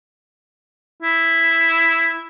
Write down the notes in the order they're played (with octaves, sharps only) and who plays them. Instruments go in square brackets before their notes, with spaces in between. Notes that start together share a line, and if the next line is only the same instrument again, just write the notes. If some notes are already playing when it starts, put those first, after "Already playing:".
[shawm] E4